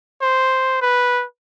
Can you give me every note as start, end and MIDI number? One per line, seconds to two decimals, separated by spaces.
0.22 0.77 72
0.82 1.24 71